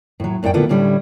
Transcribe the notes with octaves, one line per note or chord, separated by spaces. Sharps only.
A2 F#3
F#2 A2 D5 F#5 G5
A#2 D3 A3 B3 E4 F4
A2 D3 G3 C#4